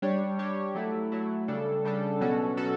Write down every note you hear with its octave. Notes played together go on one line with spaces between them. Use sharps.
G3 D4 G4 C#5
G3 D4 G4 C#5
F#3 A3 E4
F#3 A3 E4
C#3 G3 D4 A4
C#3 G3 D4 A4
B2 F#3 C#4 F#4 A4
B2 F#3 C#4 F#4 A4